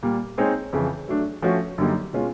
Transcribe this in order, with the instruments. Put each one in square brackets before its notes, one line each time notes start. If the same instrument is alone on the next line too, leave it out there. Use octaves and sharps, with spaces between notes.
[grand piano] A#2 G3 A#3
G#3 C4 D#4 G#4 C#5
F2 C#3 E3
F#3 A3 D4
F3 A3 C#4 F#4
F#2 D3 G3 A#3 D#4
B2 G#3 C#4 F4